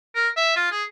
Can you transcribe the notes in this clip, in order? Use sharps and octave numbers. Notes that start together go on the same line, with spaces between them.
A#4
E5
F4
G#4